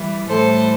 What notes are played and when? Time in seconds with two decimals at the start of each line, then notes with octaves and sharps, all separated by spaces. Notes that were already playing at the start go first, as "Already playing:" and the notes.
Already playing: E3 G3
0.28 A2 E3 G3 A4 C5